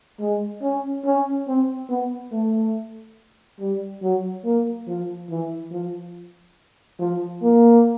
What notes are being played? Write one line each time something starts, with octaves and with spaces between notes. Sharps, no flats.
G#3
C#4
C#4
C4
B3
A3
G3
F#3
A#3
F3
E3
F3
F3
A#3